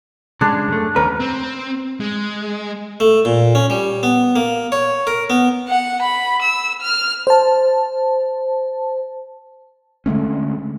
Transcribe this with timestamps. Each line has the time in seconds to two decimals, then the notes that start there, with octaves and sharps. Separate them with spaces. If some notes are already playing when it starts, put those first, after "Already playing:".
0.41 C#3 G#3 D4
0.68 F#2 A3
0.96 D#2 C#4 A#4 B4
1.20 C4
2.00 G#3
3.00 A3
3.25 A#2
3.55 C#4
3.70 G3
4.03 B3
4.36 A#3
4.72 C#5
5.07 A#4
5.30 B3
5.69 F#5
6.03 B5
6.42 E6
6.82 F6
7.27 C5 A5
10.06 D3 G#3 A3 C#4